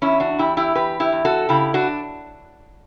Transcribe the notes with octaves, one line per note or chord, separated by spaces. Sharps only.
E2 C#4 E4
D4 F#4
E2 E4 G4
E4 G4
E2 G4 B4
E4 G4
E2
F#4 A4
C#3 E4 G4
D4 F#4